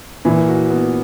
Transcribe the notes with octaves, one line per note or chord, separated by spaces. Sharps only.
A#2 E3
F#4
B3